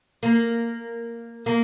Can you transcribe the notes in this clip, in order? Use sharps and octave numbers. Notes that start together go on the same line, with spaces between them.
A#3
A#3